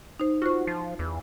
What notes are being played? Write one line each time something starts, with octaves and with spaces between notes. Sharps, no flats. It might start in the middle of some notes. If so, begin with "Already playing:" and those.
D#4 C5
F4 F#4 C5
F3
E2